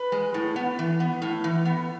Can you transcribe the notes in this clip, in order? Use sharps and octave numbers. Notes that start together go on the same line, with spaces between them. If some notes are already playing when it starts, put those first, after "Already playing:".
Already playing: B4
G#3
A2
B3
E3
B3
A2
E3
B3